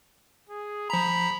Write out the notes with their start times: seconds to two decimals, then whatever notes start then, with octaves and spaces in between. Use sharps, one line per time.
0.49 G#4
0.90 F3 A#5 B5